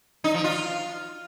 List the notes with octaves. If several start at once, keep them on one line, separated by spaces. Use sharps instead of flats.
D#4
F3
F4